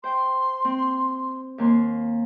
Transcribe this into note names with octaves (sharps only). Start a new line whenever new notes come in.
C5 G5 C6
C4
D#2 A#3 C6